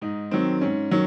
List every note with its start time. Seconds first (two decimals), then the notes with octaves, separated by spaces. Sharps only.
0.02 G#2 D#4
0.31 D#3 F#3 C4
0.61 G#2 C#4
0.91 D#3 F#3